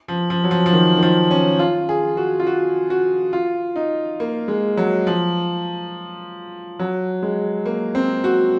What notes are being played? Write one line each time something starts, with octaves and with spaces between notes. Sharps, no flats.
F3
F3
F#3
F3
F3
D#3
D#3
F3
C#4
F4
G#4
F#4
F4
F#4
F#4
F4
D#4
A#3
G#3
F#3
F3
F#3
G#3
A#3
C4
F#4